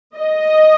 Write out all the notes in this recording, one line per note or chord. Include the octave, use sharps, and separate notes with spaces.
D#5